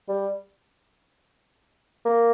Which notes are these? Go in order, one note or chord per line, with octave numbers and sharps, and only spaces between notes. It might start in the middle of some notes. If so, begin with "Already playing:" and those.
G3
A#3